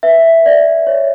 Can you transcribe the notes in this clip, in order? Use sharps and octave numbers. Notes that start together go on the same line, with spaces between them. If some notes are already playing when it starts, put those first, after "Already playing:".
B4 E5
D5
C#5